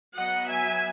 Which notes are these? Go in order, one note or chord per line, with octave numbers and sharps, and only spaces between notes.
F#3 B3 D#5 F#5
E5 G#5